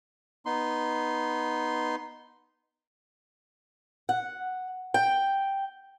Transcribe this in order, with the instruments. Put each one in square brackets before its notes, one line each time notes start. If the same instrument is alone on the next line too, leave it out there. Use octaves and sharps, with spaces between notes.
[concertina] B3 D#4 C6
[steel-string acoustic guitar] F#5
G5